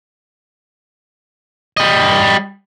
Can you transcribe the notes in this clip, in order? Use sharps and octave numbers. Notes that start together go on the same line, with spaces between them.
G3 D#5